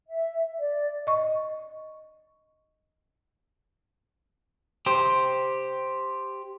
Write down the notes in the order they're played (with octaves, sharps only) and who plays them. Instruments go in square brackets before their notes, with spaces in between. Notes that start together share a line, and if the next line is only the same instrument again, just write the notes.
[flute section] E5
D5
[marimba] D#5 C#6
[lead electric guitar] G4 C5